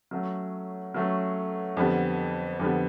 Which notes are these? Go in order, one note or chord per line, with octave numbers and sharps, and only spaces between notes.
F#3 A3 C#4
F#3 A3 C#4
F2 D3 G3 B3
F2 D3 G3 B3